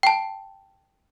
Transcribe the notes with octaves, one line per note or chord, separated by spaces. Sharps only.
G5 A5